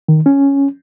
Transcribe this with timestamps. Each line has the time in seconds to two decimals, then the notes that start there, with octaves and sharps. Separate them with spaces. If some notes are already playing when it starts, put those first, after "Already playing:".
0.08 D#3
0.26 C#4